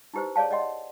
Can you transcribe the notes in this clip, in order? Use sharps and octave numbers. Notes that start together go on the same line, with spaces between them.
D#4 E4 G4 B4 C5
G#4 C#5 D5 F5 A5
D5 D#5 F#5 C6